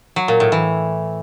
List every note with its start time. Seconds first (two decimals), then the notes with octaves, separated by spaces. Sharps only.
0.16 F#3
0.28 A#2
0.40 A2
0.52 E3